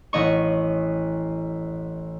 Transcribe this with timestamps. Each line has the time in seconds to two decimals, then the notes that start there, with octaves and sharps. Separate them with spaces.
0.13 A1 D#5 C#6